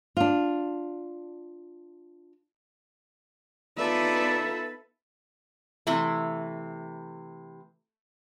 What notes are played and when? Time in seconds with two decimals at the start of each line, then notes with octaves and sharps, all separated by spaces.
0.17 D4 F4
3.77 B3 D#4 F4 A4 B4 D5 E5
5.87 C3 E3 A3 E4 C6